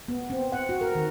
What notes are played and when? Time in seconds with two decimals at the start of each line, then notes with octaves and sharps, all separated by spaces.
0.08 B3
0.30 C4
0.52 F#5
0.69 F#4
0.81 A#4
0.95 D#3